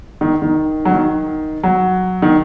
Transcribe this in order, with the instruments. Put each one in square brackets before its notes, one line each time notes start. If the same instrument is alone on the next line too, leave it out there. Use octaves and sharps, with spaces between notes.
[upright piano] D#3
D#3
F#3
D#3
F#3
D#3